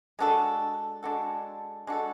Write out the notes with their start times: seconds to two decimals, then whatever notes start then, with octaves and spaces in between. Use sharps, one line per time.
0.19 G#3 D4 F#4 A4
1.03 G#3 D4 F#4 A4
1.87 G#3 D4 F#4 A4